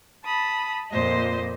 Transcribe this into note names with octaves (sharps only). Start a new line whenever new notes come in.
A5 B5 D#6
F2 A#2 C5 D#5